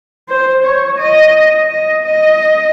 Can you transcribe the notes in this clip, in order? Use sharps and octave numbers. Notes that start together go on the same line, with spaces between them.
C5
C#5
D#5
D#5
D#5